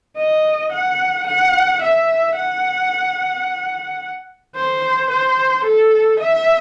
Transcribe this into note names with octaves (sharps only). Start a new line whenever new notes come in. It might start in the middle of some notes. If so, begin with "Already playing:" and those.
D#5
F#5
F#5
E5
F#5
C5
C5
A4
E5